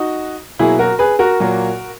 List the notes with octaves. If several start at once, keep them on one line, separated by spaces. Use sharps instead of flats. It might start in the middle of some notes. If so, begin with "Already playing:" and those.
Already playing: D#4 F#4
B2 F#3 A#3 E4 G#4
F#4 A#4
G#4 B4
F#4 A#4
A#2 F#3 A#3